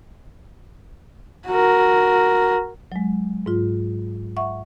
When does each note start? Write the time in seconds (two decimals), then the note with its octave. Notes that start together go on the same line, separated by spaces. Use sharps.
1.47 F#4 A#4
2.92 F#3 G#3
3.46 G#2 F4
4.37 E5 F#5 C#6